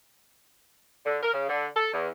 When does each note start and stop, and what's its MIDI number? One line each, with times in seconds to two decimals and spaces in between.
1.06 1.18 50
1.22 1.33 70
1.34 1.46 49
1.49 1.67 50
1.77 1.93 69
1.94 2.09 40